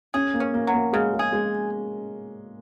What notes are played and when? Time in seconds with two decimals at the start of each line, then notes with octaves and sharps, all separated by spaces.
0.14 C#4 G#4
0.34 A#3
0.40 C#4
0.54 A#3
0.67 F#3
0.74 A#3
0.93 C#3 G#3
1.13 G#3
1.19 G#4
1.33 G#3